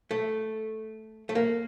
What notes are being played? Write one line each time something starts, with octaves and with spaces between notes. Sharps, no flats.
A3
A3
A#3